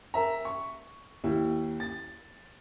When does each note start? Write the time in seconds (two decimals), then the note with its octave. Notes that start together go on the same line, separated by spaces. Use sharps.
0.14 A#4 E5 A#5
0.45 C#6
1.24 D#2 E4
1.80 A6